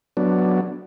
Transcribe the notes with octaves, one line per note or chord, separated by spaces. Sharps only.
F#3 B3 D4